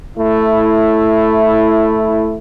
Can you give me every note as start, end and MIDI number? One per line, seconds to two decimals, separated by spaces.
0.17 2.38 57
0.17 2.38 64